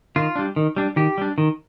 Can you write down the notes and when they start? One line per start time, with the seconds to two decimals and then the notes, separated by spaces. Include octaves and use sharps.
0.16 D#3 F4
0.36 G3 D4
0.56 D#3
0.76 G3 D4
0.96 D#3 G4
1.18 G3 D4
1.38 D#3